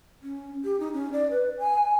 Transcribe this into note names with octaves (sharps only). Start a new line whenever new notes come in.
C#4
G4
D#4
C#4
D5
B4
G#5